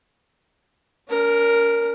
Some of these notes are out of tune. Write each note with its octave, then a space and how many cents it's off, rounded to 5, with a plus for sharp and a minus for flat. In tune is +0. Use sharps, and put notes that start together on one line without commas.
C#4 +45 A#4 +0